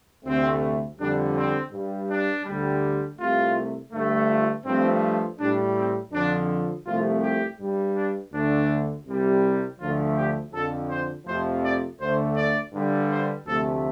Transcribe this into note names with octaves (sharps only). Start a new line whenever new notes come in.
D2 C3 A3 C4
F2 D3 G3 D4
C4
G2 G3
D4
D2 D3 G3
C2 C3 A3 F4
G2 D3 A3
F4
G2 F3 A3 C4
A2 G3 D4
C4
F2 D3 F3 D4
C2 C3 F3 A3 F4
G4
G2 G3
D4
D2 D3 A3 D4
C2 C3 G3
D2 D3 F3 A3 F4
G4
F2 D3 F3 A4
C5
F2 C3 F3 A3 C5
D5
D2 D3 A3 C5
D5
G2 D3 G3
C5
D2 C3 F3 A3 A4